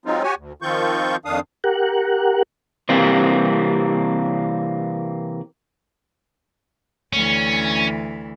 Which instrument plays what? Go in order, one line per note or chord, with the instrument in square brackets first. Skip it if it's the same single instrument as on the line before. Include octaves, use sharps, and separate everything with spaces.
[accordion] F#3 G#3 C4 D#4 F4
F#4 G4 C#5 G#5
D2
D#3 F3 C4 F4 C#6 G6
F2 D#3 D4 F5 D#6
[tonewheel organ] G4 A#4 F#5
[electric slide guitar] C3 E3 G3 A#3 C4
[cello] D2 E3 [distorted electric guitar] C#4